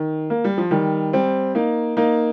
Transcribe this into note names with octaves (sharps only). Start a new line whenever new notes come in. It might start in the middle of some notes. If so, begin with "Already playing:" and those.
Already playing: D#3
A#3
G3
F3
D#3 G3
G3 C4
A#3 D#4
A#3 D#4